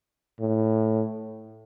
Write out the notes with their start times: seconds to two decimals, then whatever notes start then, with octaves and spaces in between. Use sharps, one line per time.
0.40 A2